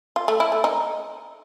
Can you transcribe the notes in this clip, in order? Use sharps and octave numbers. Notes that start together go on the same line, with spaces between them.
F4
A3
E4
A3
D#4